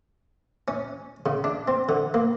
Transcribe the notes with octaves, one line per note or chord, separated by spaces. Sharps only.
C#4
C#3
D4
C4
D3
A#3